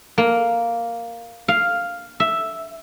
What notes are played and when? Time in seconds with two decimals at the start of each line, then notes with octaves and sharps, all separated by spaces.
0.18 A#3
1.48 F5
2.20 E5